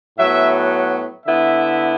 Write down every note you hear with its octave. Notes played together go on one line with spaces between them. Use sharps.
A2 F#3 B3 E5
D3 B3 E4 E5